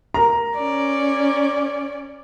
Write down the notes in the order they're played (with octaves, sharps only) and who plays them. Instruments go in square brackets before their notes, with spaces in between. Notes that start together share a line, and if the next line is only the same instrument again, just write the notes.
[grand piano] A#4 A#5
[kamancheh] C#4 D5